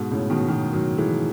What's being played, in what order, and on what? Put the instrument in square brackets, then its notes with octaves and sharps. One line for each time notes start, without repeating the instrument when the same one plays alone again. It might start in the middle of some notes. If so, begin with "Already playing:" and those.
Already playing: [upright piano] G#2 B2
A2 C#3
B2 D#3
B2 D#3
D#3 F#3
E3 G#3